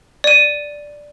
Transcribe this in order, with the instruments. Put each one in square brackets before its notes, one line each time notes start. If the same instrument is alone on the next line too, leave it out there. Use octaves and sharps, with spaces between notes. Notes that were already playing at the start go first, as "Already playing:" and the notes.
[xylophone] D5 D#7